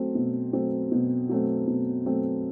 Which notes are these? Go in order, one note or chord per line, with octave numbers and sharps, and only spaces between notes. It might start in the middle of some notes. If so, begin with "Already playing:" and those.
Already playing: F#3 A3 C4
B2
F#3 A3 C4
B2
F#3 A3 C4
B2
F#3 A3 C4